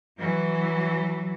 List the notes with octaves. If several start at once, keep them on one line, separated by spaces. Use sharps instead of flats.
E3 F#3